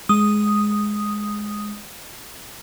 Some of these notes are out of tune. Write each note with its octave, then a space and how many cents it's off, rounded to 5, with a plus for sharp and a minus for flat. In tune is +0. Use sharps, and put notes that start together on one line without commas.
G#3 +10 D#6 +0